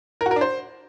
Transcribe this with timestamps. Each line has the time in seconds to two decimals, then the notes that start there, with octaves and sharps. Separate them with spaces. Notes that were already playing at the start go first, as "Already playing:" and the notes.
0.21 A#4
0.26 F#4
0.31 A#4
0.36 D4
0.41 C5